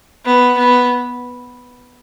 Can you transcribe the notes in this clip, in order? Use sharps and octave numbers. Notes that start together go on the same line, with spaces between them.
B3
B3